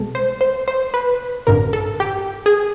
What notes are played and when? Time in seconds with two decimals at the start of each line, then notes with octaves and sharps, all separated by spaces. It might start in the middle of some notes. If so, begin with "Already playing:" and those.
Already playing: C2 B2 G#3 A4
0.15 C5
0.41 C5
0.68 C5
0.94 B4
1.47 A1 G2 D3 A#4
1.73 A4
2.00 G4
2.46 G#4